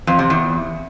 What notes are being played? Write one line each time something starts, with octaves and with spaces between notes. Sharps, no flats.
F2
C3
E2